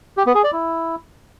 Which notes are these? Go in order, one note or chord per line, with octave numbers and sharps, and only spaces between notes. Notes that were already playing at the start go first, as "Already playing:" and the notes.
G4
B3
G#4
D5
E4